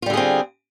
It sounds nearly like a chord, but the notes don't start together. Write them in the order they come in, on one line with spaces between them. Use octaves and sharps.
F4 G3 D3 G#4 C4